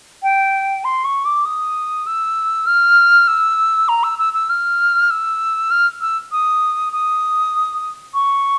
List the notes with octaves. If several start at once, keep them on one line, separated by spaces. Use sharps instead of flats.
G5
C6
C#6
D6
D#6
E6
F6
E6
A#5
E6
E6
E6
F6
E6
F6
E6
D#6
D#6
C#6